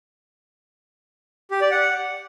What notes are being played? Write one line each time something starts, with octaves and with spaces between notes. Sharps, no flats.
G4
D5
F#5